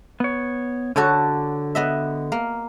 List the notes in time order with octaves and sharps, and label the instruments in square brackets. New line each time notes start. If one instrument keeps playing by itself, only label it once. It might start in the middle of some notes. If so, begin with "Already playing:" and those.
[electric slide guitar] B3 C#5
[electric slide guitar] D3 [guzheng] F#4 A4 C#5
[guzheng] B3 D#5 E5
A#3